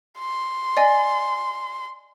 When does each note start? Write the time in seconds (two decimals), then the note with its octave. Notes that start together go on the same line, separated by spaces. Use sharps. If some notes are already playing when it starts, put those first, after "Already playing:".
0.18 C6
0.77 D5 D#5 G#5